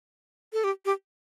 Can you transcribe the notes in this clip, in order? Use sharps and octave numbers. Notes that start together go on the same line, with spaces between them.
A4
G4
G4